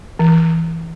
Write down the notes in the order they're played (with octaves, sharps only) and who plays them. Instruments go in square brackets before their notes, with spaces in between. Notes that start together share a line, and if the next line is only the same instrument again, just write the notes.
[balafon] E3